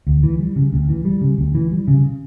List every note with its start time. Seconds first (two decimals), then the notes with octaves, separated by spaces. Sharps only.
0.07 D2
0.23 E3
0.39 G3
0.56 C#3
0.72 D2
0.89 E3
1.05 G3
1.21 C#3
1.38 D2
1.55 E3
1.71 G3
1.88 C#3